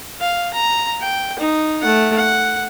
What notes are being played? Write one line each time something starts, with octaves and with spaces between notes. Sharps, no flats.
F5
A#5
G5
D#4
A3 F#5
F#5